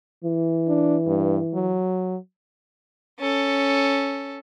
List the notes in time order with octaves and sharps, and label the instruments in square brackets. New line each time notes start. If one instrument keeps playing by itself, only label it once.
[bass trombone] E3
[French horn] D4
G2
F#3
[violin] C#4 A4